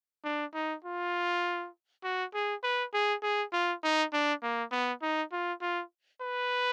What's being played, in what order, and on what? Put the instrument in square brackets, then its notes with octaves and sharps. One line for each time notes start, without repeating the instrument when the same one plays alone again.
[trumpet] D4
D#4
F4
F#4
G#4
B4
G#4
G#4
F4
D#4
D4
A#3
B3
D#4
F4
F4
B4